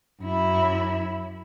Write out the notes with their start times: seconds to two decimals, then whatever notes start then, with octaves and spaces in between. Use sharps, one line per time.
0.21 F#2 E4